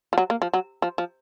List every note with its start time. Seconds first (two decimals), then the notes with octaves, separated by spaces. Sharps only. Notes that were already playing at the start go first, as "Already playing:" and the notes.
0.13 F3
0.18 F#3
0.30 A#3
0.42 F3
0.54 F#3
0.82 F3
0.98 F3